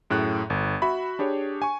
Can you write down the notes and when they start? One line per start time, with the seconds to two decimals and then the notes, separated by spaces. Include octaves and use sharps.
0.10 F#2 A2 G#4 F#6
0.50 G1
0.82 F#4 E5 B5
1.19 D4 G4 G#4 C#5
1.62 G#5 C#6